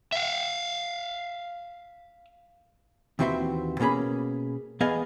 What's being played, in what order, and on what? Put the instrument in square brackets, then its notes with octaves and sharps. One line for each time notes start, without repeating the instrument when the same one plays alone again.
[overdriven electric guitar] E5 F5
[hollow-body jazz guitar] D#2 E3 C4 F#4 E5 C6
B2 A#3 C#4 G#4 B5
E2 B3 G#4 D#5 F5 G#5